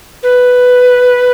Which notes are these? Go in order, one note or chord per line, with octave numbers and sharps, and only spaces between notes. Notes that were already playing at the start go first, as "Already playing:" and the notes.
B4